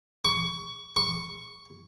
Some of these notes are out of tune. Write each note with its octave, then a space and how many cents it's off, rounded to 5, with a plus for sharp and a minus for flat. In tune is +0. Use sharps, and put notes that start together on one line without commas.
C#6 +20
C#6 +5